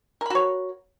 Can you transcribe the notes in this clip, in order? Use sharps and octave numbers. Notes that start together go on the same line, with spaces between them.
F#4 A#4 C#5 B5